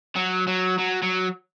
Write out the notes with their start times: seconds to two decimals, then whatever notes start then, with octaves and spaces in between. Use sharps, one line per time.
0.16 F#3
0.47 F#3
0.79 F#3
1.02 F#3